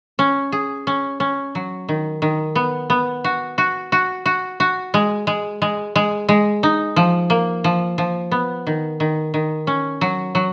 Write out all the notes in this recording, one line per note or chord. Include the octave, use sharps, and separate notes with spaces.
C#4
G#4
C#4
C#4
F#3
D#3
D#3
B3
B3
F#4
F#4
F#4
F#4
F#4
G#3
G#3
G#3
G#3
G#3
D#4
F3
A#3
F3
F3
B3
D#3
D#3
D#3
C#4
F#3
F#3